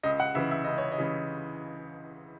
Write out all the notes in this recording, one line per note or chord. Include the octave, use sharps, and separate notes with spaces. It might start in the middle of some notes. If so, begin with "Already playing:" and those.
C#2 D#5
F#5
C#3 E3 E5
E5
C#2 D#5
C#5
D#5
C#3 E3